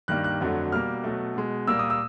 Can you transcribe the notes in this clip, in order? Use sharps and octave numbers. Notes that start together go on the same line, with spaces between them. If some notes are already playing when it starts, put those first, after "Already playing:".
G2 D#3 G3 A#3 F#6
F#6
F2 D3 F#3 A3
B2 G3 A#3 F6
B2 F#3 A3
B2 G#3
A#2 G3 A#3 E6
D#6
E6